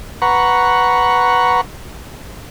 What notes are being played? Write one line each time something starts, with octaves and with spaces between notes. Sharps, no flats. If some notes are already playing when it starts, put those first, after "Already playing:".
B4 F#5 A#5 C#6